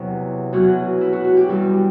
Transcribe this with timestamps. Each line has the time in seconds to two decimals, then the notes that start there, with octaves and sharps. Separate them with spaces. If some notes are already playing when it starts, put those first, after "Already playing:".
Already playing: E2 C3 F#3 E4
0.52 E2 B2 F#3 F#4
1.01 E4
1.13 F#4
1.24 F#4
1.37 G4
1.48 G2 E3 G3 G4